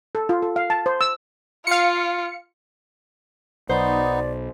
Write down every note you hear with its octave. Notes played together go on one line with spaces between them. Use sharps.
A4
F4
A4
F5
A5
C5
E6
F4 F5 C#7
B1 B3 D#4 C5 D5